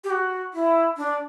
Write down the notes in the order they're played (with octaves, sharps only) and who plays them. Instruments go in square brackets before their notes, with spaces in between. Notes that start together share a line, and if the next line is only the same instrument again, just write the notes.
[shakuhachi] G4
F#4
E4
D4